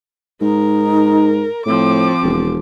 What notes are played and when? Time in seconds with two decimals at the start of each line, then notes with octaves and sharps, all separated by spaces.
0.42 G#2 D#4 A#4
1.66 A2 F3 C4 D6
2.23 E1